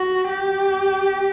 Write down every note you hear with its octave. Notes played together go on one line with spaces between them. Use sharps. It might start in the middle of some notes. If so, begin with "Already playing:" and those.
Already playing: F#4
G4